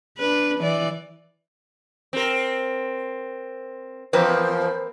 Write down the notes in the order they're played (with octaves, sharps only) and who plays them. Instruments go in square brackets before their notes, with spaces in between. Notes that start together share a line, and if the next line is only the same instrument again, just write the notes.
[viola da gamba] D4 B4
E3 D5
[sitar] C4 A#4
[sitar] E2 F3 [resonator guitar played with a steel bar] A#3 C4 B4 [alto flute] C5